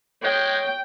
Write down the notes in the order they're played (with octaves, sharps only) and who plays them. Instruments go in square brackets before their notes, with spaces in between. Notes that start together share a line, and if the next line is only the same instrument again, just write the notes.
[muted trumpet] G#3 [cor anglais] C#5 [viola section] G5